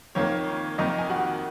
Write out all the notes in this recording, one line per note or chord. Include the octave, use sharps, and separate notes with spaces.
F2 D#3 A#3 C#5
F2 D#3 A#3 D#4 D#5
G#5
F#4 F#5